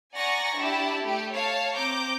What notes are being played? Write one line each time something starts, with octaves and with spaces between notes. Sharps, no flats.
D5 F#5 G#5 A#5 C#6 A#6
D4 E4 G4 A5
A3 G4
C#5 F5 A5
C4 A#5 D6 G6